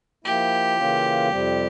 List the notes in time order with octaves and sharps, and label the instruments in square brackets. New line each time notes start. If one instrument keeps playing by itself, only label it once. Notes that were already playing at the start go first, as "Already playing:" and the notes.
[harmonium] F3 A#3 E4 [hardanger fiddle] G4
[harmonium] C#3 E3 A#3 C#4 F4
F2 C3 G3 C4